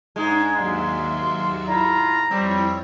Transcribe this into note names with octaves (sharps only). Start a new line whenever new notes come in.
G#2 G#3 D4 D#4
D#2 F#3 D5 E5 F5 C6
E4 F4 A#5
F2 G3 C4 E4 C#5